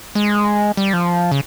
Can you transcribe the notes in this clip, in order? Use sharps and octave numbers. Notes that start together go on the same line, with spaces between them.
G#3
G3
F3
C#3